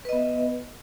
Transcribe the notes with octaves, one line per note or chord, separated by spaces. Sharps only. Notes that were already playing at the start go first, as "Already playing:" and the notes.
B3 B4 D#5 E5